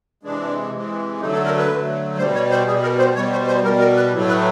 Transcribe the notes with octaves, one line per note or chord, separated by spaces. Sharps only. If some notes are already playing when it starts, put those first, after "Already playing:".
C3 E3 G#3 D4
C3 E3 G#3
D3 F#3 A3 D#4
A4
A#4
B4
D3 F#3 A3
B2 G3 C5
C#5
C5
B2 G3 G#4
A#4
C5
B2 G3 C#5
C5
C5
B2 G3 A#4
A#4
B4
A2 F#3 A3
B4